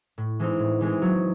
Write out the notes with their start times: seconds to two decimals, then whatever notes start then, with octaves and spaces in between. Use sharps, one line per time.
0.18 A2
0.39 E3 G#3 C4 D#4
0.59 A2
0.81 E3 G#3 C4 D#4
1.02 F#3